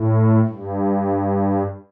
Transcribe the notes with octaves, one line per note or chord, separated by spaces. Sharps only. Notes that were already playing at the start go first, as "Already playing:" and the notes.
Already playing: A2
G2